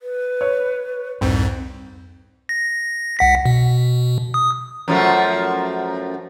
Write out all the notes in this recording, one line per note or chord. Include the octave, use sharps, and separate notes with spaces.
B4
C#5
C2 F2 G#2 C4
A#6
C2 F#5 B6
B2
D#6
F#2 F3 A3